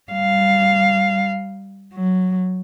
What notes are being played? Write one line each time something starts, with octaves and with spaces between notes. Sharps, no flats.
G3 F5
F#3